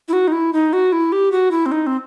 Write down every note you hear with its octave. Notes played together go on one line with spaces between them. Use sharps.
E4
F#4
D#4
E4
D#4
F#4
E4
G4
F#4
E4
C4
D#4
C4